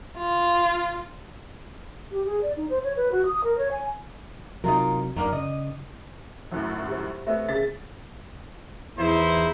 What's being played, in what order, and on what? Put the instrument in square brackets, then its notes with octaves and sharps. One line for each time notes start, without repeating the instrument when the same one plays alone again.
[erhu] F4
[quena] G4
G#4
D5
D#4
C5
C#5
B4
F#4
D#6
A#4
C#5
G#5
[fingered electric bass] C3 F#3 [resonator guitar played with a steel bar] D#4 F4 A#4
[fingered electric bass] F#2 [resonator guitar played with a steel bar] D#3 A#3 D4
[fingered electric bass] C#3 [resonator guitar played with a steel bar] D#5
[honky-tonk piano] G#1 F#2 A2
[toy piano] G4 C5
[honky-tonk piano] A3 B3 A4 [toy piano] C5 D#5 E5
[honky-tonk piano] C#3 A6 B6 [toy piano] G#4 A#4 D#5
[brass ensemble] E2 [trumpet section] D#4 E4 C5